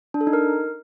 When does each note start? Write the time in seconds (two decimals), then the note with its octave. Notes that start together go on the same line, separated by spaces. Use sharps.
0.14 D4
0.21 A4
0.27 D#4
0.33 A#4